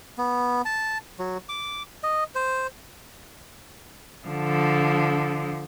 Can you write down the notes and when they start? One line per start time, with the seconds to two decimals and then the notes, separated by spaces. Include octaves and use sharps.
0.18 B3
0.65 A5
1.19 F#3
1.49 D6
2.03 D#5
2.35 C5
4.27 D3 F3